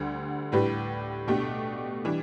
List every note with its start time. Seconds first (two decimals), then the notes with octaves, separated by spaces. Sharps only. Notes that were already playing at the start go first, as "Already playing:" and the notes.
Already playing: D2 D3 G3
0.52 A2 G3 D4 G4 B4
1.27 B2 A3 D4 G4
2.05 E3 G3 D4